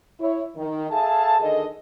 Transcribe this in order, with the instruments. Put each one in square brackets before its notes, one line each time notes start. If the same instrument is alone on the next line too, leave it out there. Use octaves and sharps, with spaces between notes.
[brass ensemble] E4 C#5
D#3
G#4 A4 E5 F5 G#5 A5
D2 D3 D#3 G#4 A4 D#5